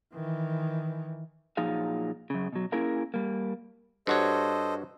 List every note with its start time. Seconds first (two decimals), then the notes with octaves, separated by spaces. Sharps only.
0.14 D#3 E3
1.57 A#2 F3 F#3 D#4 G#4 F5
2.30 F#2 C#3
2.53 B2 F#3
2.72 A#3 C#4 E4 G#4 A#4 F5
3.14 G3 A#3
4.07 G2 F#4 A4 C5 C#5 D#5